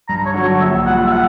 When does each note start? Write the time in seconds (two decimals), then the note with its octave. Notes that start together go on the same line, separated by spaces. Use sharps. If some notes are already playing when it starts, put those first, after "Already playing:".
0.09 G2 A#5
0.26 C#5
0.34 D3 F#3
0.43 C#5
0.60 A#1 E5
0.86 A#2 G3 F#5
1.06 E5
1.12 F#5